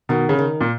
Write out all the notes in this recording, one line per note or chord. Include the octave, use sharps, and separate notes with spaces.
B2 D#3
C#3
D#3
A#2